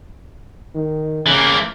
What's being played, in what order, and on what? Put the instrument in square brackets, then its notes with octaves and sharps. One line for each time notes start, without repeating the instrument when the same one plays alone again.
[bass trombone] D#3
[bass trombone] C#3 [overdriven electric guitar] E3 A#3